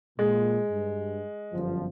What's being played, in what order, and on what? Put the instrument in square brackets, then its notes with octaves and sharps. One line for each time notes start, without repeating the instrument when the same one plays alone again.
[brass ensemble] A#2 [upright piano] G#3
[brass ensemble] G2
G1 F#2 F3